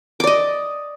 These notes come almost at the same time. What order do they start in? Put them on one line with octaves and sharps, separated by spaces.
D6 D5 D#5